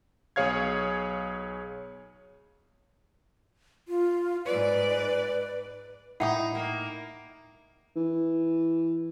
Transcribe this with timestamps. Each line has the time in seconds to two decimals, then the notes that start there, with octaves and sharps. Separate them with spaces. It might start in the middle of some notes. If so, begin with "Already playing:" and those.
0.36 B1 G#4 C#5 F5 G#6
3.88 F4
4.46 G#2 B4 D5
6.20 A2 G3 D#4 E4 F#5 G5 D#6
6.55 A#3
7.96 E3